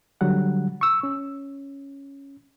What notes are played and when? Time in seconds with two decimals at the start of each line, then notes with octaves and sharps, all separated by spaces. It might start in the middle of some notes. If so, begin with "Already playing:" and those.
0.21 D3 F#3 G3 F#5
0.81 C#6 E6
1.03 C#4